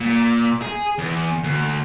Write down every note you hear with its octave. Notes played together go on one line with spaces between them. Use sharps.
A#2
G#4
E2
D2